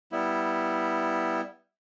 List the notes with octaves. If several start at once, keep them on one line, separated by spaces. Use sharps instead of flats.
G3 B3 E4